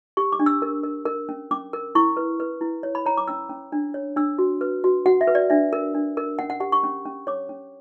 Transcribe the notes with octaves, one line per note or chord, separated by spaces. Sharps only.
G4 C#6
D6
D4
E6
A#4
A#4
A#4
C#4
C#4 D6
A#4
E4 C#6
B4
B4
E4
C#5
B5
C#5 A#5
D6
C#4 E6
C#4
D4
C#5
D4 E6
F#4
B4
F#4
F#4 F#5
E5
B4
D5
D4 E5
A#4
D4
A#4
C#4 F#5
F#5
G4 F#5
C#6
C#4
C#4
C#5 D6
C#4